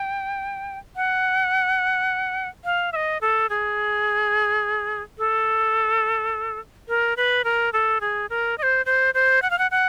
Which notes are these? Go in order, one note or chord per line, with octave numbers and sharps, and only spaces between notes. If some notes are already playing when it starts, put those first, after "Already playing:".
Already playing: G5
F#5
F5
E5
D#5
A4
G#4
A4
A#4
B4
A#4
A4
G#4
A#4
D#5
C5
C5
C5
F#5
F5
F#5
F#5